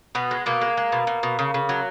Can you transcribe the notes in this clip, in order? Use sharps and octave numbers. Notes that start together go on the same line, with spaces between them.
B2 B3
G#3
B2 A#3
G#3
G#3
B2
B2
B2
C#3
C#3
F#3